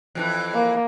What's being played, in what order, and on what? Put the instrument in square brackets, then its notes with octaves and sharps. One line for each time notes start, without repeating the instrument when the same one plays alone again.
[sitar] F2 C3 E3
[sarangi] A#3